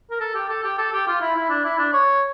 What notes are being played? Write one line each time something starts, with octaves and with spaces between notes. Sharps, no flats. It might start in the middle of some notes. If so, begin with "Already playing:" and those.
A#4
A4
G4
A4
G4
A4
G4
F4
E4
E4
D4
E4
D4
C#5